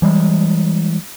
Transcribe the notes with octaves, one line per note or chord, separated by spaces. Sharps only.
E3 G3 G#3